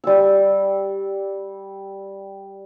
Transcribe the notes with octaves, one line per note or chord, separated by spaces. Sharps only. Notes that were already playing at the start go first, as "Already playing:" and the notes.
G3 E6